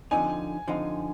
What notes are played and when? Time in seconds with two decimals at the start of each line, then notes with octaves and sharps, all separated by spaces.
0.11 D3 F3 C4 D#4 G#5
0.68 D3 F3 C4 D#4